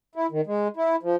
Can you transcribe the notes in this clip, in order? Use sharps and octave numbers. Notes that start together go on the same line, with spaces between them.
E4
D#3
G#3
E4
F3